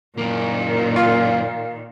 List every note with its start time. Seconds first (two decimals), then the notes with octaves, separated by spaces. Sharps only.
0.18 F#2 A#2 D#3 A#3
0.96 F4